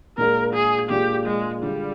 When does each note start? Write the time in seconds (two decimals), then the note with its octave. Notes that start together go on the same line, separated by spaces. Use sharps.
0.18 A#2 G#3 D4 F4 A#4
0.53 G#4
0.90 A#2 G#3 D4 F4 G4
1.26 G#3
1.63 D3 G3 G#3 D4 F4